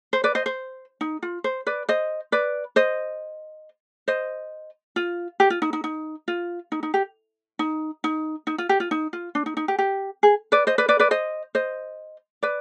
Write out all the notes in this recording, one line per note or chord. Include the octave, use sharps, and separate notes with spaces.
C5
B4 D5
C5 D#5
C5
D#4
F4
C5
B4 D5
C5 D#5
B4 D5
C5 D#5
C5 D#5
F4
G4
F4
D#4
D#4
D#4
F4
D#4
D#4
G4
D#4
D#4
D#4
F4
G4
F4
D#4
F4
D4
D#4
D#4
G4
G4
G#4
B4 D5
C5 D#5
B4 D5
B4 D5
B4 D5
C5 D#5
C5 D#5
B4 D5